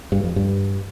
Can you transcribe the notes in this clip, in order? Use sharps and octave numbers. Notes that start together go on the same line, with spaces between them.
G2
F2
G2